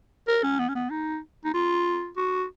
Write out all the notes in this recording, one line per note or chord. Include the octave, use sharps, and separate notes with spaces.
A#4
C#4
B3
C#4
B3
D#4
D#4
F4
F#4